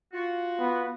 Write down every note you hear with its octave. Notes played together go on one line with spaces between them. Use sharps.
F4 F#4
B3